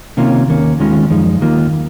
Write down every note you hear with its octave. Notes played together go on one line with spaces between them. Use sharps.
C3 D#3 A#3 C#4 F4
D#2 D#3 A#3 C#4
D#2 D#3 G#3 C#4 F4
F#2 F3 G#3 D#4
D#2 D#3 A#3 F4